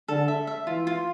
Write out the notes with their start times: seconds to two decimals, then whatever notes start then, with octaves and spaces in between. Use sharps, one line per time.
0.08 D3 A4
0.28 E5
0.47 E5
0.67 E3 F4
0.87 F4